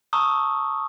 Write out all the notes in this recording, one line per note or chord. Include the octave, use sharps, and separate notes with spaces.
A5 A#5 C#6 D#6 E6